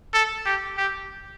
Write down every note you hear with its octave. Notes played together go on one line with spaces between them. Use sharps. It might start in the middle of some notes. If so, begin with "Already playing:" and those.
A4
G4
G4